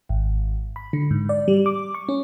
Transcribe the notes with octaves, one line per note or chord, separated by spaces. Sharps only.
G#1
B5
D3
G#2
D5
G3
D6
C#6
C#4